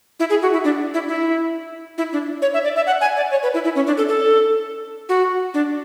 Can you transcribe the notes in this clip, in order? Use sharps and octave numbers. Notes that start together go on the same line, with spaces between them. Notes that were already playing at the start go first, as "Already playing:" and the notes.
E4
G#4
F#4
E4
D4
E4
E4
E4
D4
C#5
E5
D5
E5
F#5
G#5
D5
C#5
B4
E4
E4
C#4
D4
A4
A4
F#4
D4